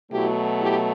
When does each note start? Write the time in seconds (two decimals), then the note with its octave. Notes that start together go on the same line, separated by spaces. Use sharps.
0.11 B2 F#3 A3 E4 G4
0.60 E4 G4